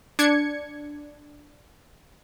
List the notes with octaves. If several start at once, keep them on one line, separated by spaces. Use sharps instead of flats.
D4 G#6 C#7